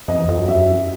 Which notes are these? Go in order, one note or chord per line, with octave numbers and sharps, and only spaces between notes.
F2 D#5
E2
F2
F#2
E5